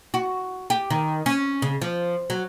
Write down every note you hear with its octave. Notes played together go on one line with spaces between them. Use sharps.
F#4
G4
D#3
C#4
C#3
F3
F#3